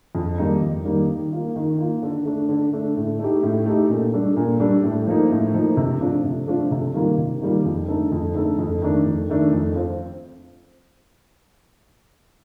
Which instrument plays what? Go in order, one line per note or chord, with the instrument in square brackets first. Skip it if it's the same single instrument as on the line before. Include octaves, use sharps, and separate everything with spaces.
[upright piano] F2
D#3 G3 A#3 D#4
F2
D#3 G3 A#3 D#4
D#3
A#3 F4
D#3
A#3 F4
D3
A3 D4
D3
A3 D4
A2
A3 D#4 G4
A2
A3 D#4 G4
A#2
G3 D4 A4
A#2
G3 D4 A4
A2
F3 A#3 D#4
A2
F3 A#3 D#4
C3
F3 A3 D4 F4
C3
F3 A3 D4 F4
C3
D#3 G3 A#3 F4
C3
D#3 G3 A#3 F4
F2
D3 A3 D#4 A4
F2
D3 A3 D#4 A4
F2
D#3 A3 D4
F2
D#3 A3 D4
F2
C4 F4